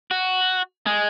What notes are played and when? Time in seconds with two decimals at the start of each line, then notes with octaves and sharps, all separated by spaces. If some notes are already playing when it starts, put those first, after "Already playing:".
0.11 F#4
0.86 G#3